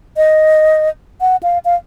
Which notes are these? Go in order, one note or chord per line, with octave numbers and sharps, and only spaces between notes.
D#5
F#5
F5
F5